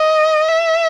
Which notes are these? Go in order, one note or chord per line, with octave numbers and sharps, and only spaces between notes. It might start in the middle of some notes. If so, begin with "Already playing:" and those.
Already playing: D#5
E5